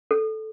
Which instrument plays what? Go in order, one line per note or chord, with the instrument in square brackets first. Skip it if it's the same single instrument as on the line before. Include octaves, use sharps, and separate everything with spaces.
[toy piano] A4